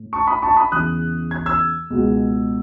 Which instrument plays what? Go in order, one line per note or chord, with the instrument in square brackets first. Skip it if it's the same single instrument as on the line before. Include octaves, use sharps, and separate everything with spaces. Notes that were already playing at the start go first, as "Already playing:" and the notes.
Already playing: [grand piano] A2
A5 C#6
B5 D#6
A5 C#6
B5 D#6
E2 C#3 E3 D#6 F#6
G#6
E6 G#6
C#2 B2 G#3